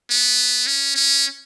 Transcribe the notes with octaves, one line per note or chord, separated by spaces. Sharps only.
B3
C#4
C#4